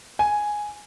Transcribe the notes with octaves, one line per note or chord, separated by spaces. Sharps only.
G#5